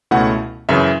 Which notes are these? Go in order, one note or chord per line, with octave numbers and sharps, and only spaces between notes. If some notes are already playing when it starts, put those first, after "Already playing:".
C#2 B2 A3 C#4 E4 F#5
F#2 C#3 E3 E5